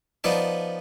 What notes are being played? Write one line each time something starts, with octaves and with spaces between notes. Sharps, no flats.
F3 B3 D#4 D5 A5